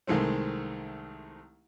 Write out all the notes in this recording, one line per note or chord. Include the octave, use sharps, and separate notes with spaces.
C2 D#3 G#3 A3 C4